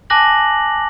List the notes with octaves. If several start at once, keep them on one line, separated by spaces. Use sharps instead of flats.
G#5 A5 D6 F#6 A#6 F#7